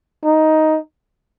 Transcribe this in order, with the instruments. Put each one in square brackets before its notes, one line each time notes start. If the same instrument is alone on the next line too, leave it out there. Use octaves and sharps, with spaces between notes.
[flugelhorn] D#4